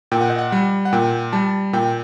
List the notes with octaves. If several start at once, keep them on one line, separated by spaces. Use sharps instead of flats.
A#2 G5
F#5
D#5
F#5
G3
F#5
A#2 G5
G3 A5
A#2 G5